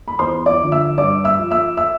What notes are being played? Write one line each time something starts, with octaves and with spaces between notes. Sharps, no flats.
B5
E2 C5 C6
D5 D6
D3 F3
E5 E6
G2 D5 D6
E5 E6
F3
E5 E6
E5 E6